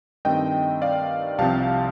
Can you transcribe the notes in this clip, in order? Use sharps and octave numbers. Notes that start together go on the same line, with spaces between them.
G2 D#3 A3 C4 D#5 G5
D5 F5
C2 C3 F3 C4 F5 A5